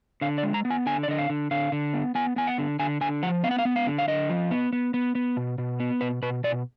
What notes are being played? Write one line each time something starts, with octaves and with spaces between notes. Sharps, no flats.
D3 F5
D5
G#3
A#5
B3
G#5
D3 G#5
D5
D3 D#5
F5
D3
D3 F5
D3
B3
B3 G#5
B3 G#5
F#5
D3
D3 G#5
D3 G#5
F3 F#5
B3 F5
F#5
F5
B3
F5
D3
F5
D3 D#5
F3
B3
B3
B3
B3
B2
B2
B3
B2 B4
B2 B4
B2 D5